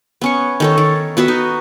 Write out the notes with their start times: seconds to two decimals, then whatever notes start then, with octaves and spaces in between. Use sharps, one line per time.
0.21 B3 C#4 C#6
0.60 D#3 A4 C#5
0.78 D#3
1.17 B3 F#4 B4 E5
1.28 D#4